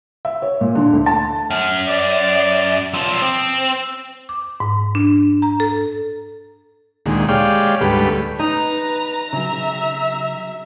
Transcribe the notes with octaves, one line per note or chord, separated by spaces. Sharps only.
E5
C#5
A#2
D3
D2
A5
F#2 F6
D5
B1 F3 E6
C4
D6
G#2
D4
A#5
A4
D2 A#2 D#3 G#3
G#3 G4 C#5 D5 F5 G5
D2 G#2 G3 A3 G4 B4
D#4 B4 A#5
C#3 F#3 E5